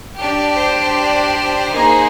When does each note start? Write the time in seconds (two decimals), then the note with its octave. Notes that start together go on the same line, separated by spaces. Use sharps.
0.17 D4 G4
0.56 C5
0.96 C5
1.75 A#3 D#4 G#4